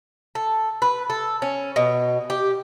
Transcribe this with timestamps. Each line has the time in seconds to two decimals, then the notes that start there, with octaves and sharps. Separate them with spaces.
0.35 A4
0.82 B4
1.10 A4
1.42 C#4
1.76 B2
2.30 G4